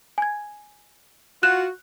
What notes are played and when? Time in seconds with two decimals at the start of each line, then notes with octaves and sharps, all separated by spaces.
0.18 G#5 G#6
1.43 F4 F#4 F#6 E7